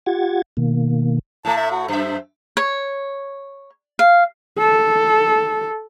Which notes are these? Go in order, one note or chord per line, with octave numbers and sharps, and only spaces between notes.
F4 G4 F#5 G#6 A6
B2 D#3 A#3
A2 A3 A5
E5
F#4
F#2 C5 E5
C#5
F5
A4